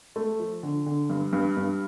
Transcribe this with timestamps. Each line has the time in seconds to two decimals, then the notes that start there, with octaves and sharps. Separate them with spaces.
0.16 A3
0.40 F3
0.63 D3
0.86 D3
1.10 G2
1.33 G2
1.57 G2